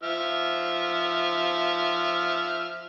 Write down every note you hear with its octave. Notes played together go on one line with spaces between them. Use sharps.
F3 E5 F6